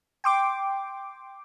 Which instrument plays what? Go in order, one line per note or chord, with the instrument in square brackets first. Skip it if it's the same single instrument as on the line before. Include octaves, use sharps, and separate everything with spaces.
[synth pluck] G5 C6 D6